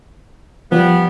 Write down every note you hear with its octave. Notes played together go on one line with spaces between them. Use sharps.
F3 G3 B3